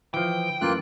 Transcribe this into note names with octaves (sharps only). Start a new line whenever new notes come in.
E3 F3 G5
F#2 E3 A3 A#3 F4 F#6